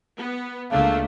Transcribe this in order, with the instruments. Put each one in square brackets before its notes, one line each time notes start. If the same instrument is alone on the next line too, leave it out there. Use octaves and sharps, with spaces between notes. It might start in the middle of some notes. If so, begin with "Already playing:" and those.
[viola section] B3
[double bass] C#2 C#3 [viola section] A3 A#3 D4 [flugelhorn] F5